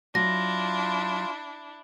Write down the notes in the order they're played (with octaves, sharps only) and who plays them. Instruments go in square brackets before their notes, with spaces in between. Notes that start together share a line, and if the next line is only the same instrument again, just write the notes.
[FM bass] F#3 [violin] D4 E4 [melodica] F4 [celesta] A#6